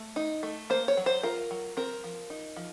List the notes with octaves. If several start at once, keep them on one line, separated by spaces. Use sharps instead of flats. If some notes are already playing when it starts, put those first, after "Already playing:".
Already playing: A3
D#4
A3
A#3 C5
C#5
F#3
C5
F4 A#4
F#3
C4 A#4
F3
D#4
F3